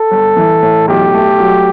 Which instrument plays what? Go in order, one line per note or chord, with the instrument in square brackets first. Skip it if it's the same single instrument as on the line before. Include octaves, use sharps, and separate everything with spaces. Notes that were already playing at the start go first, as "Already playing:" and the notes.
Already playing: [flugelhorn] A4
[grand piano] G1
E3
A2
[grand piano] B1 [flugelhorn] G4
[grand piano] A3
F#3